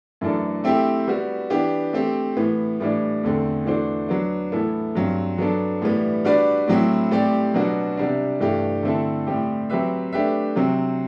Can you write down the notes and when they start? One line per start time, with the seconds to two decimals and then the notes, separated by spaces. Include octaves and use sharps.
0.21 F#2 E3 A3 D4 A4
0.64 A3 C4 E4 G4
1.07 G3 B3 F#4
1.50 E3 B3 D4 G4
1.93 A3 C4 G4
2.37 A2 E3 B3
2.80 A2 E3 G3 D4
3.23 E2 D3 A3 C4
3.66 E3 A3 D4 F#4 C5
4.09 F#3 B3 D4
4.52 A2 E3 B3 E4 A4
4.95 G2 F#3 C4
5.38 F#3 B3 D4 A4
5.82 A2 E3 G3 B3
6.24 G3 D4 F#4 B4 D5
6.68 A2 F#3 C4 E4
7.11 A2 G3 C4 G4 D5
7.54 B2 F#3 B3 D4 F#4
7.97 C3 G3 D4
8.40 G2 E3 A3 D4 G4
8.83 D3 A3 C4 E4 A4
9.27 A2 G3 C4 G4
9.70 F#3 C4 G4 B4 E5
10.12 A3 D4 G4 B4 E5
10.56 C3 F#3 C4